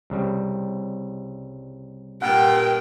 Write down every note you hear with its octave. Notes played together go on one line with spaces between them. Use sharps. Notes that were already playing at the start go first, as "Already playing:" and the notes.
C2 C#3 G3
G2 A#2 F#5 G5